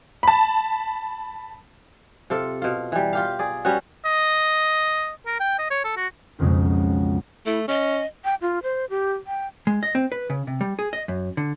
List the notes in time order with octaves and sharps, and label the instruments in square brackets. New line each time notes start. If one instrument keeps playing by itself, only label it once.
[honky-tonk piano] A5 B5
[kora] C3 F4 A4
B2 F4
E3 G3
F4 G4 F5
G#4 D5
G3 B3 C#4 F#4
[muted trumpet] D#5
[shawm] A#4
G5
D#5
C#5
A4
F#4
[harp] B1 F2 C#3 F#3 G#3
[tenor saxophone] A3 [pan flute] E4
[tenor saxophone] C#4 [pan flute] D#5
[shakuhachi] G5
F4
C5
G4
G5
[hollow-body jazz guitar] G#3
D#5
C4
B4
C#3
C3
G3
G#4
D#5
F#2
D3